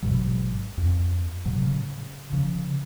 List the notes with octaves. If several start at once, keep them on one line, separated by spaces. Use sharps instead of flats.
A1 G#2 B2 F#3
F2
A2 C3 F#3
C#3
C#3 F3